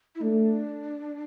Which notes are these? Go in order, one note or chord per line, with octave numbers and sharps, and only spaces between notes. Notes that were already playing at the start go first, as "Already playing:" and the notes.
E4
A3 D4